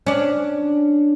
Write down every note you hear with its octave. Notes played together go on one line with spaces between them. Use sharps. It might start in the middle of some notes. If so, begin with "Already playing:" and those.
C#4 D4